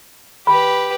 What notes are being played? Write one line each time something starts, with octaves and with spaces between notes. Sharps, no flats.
G4 B4 B5